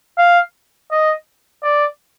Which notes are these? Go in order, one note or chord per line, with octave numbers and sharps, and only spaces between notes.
F5
D#5
D5